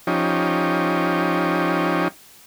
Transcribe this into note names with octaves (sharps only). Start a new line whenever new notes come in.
F3 C#4 D#4 G4